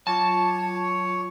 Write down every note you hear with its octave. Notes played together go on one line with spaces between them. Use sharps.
F#3 F4 C#5 A5 D6